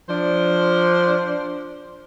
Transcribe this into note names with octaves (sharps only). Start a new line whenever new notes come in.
F3 D4 C5